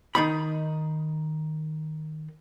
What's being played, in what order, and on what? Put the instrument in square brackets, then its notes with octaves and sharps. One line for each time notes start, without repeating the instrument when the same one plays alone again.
[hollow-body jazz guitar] D#3 D#4 B5